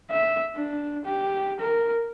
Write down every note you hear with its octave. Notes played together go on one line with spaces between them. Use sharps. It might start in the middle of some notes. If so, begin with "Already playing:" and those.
E5
D4
G4
A#4